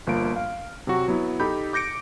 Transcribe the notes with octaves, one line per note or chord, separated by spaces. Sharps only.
G1 F3 A#3 D7
F5
C3 F#3 F#4
F#3 B3 E4
D#4 G4 A4 B5 G6
D6 G6 A#6 C#7 D7